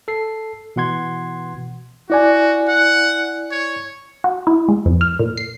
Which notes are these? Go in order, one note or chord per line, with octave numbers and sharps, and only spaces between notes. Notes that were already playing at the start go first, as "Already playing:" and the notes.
A4 C7
B2 E3 F#5 C6 G#6
E4 F#4 D5 G#5
F#5
C#5
F#4
E4
G#3
F2
F6
A#2
C7